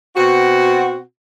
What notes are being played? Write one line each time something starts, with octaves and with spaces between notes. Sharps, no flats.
B2 C4 F#4